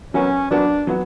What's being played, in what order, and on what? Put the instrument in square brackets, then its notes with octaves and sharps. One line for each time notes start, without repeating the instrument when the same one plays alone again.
[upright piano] F#3 B3 F#4 A#4 [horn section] C#4
[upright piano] F#3 B3 F#4 A#4 [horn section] D4
[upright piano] F#3 B3 F#4